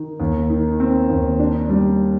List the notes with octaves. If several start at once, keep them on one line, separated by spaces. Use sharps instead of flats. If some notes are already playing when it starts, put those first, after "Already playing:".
Already playing: D#3
D#2
D#3
C4
D#2
D4
G3